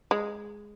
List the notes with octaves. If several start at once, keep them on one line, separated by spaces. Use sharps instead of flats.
G#3